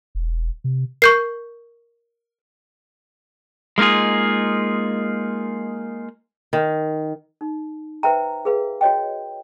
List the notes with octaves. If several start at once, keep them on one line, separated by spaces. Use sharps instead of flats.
E1
C3
A#4 C#6 G6 C7
G#3 A#3 D#4 F4 G#4
D#3
D#4
B4 C5 E5 G5 A#5
G#4 B4 F5
F#4 C#5 D#5 G5